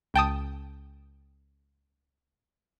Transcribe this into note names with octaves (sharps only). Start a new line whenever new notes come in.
C#2 G5 A5 D#6